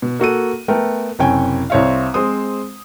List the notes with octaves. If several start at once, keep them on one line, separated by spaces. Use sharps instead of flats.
B2
A#3 F#4 A4 D#7
A3 B3 A#4 G5
F#1 C3 C#4 G5 G#5
C2 C4 C#5 E5 F5
G#3 C4 C5 D#6